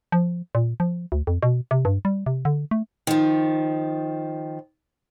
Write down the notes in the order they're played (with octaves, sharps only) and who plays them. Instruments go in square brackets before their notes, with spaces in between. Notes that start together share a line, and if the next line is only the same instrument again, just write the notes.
[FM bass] F3
A#2
F3
D2
F2
B2
C3
G2
G3
C3
D3
A3
[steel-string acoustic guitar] D#3 F3